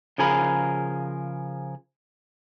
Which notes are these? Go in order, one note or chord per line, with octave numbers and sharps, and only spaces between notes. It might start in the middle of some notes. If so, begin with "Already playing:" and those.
C#3 F3 G#4 A#4 B5